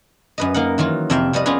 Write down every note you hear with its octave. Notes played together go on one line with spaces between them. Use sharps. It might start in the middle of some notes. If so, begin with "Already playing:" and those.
F#2 B4 D#5
A#3 D#4 A#4 F#5
D#3 E3 F#3 F4
F2 C3 E4 E5 F5 G5
F2 G3 B4 D#5
B3 C#4 F4 G4 G#4 B4